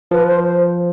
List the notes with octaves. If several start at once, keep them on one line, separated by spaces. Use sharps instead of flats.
F3 B4
C5
C5